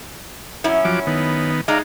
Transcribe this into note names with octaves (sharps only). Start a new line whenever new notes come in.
F#2 C#4 E4
F3 F#3 D6
D#3 B3
G#3 D#4 D5 F5 A#5